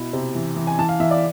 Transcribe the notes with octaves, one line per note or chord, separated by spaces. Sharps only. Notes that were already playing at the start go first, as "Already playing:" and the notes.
Already playing: B2 E4
C3
E3
E3
G#5
E3 A5
F5
E3 E5
D5